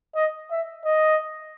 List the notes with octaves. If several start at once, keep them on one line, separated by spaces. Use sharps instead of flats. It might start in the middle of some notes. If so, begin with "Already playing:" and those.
D#5
E5
D#5